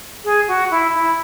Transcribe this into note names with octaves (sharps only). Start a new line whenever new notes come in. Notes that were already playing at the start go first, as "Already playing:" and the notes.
G#4
F#4
E4
E4